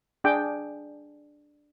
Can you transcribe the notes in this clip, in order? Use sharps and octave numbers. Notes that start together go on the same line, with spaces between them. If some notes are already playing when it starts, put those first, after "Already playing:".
D4 G#4 G5 D6